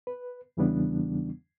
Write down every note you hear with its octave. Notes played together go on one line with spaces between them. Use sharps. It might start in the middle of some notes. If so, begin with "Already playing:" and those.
B4
E2 C#3 E3 G3 B3 D4